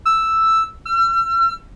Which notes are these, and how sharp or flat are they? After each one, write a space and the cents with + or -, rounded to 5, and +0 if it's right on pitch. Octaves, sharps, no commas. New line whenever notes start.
E6 +0
E6 +45